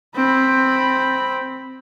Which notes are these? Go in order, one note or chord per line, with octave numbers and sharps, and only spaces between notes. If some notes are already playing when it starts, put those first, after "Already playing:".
C4 B5